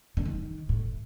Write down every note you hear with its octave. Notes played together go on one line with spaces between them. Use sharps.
D3
D#3
A2